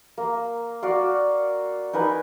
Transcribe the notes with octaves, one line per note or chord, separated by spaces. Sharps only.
A#3
F#4 D5 F5
D#4 A#4 B4 G#5